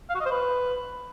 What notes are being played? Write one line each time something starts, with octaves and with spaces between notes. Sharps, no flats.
F5
F#4
D#5
C5
B4